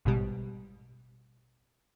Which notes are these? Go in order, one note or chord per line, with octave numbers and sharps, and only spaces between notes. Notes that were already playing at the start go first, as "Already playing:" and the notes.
A1 G#2 B2 G3